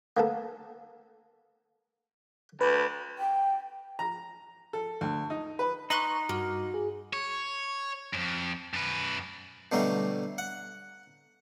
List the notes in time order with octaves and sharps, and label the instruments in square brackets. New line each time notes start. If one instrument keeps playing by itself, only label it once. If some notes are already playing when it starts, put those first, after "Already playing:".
[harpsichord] A#3 B3 A4
[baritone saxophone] D2 [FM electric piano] B4
[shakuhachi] G5
[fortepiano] A#5
A4
D2
D#4
B4
[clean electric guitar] D#4 [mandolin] B4 C6 F#6 [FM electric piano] A#5 C#6
[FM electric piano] G2 [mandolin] A#3 [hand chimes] F#4
[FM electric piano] G#4
[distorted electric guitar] C#5
F2 G#2
F#2 B4
[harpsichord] B2 D3 F#3 G3 A3
F#5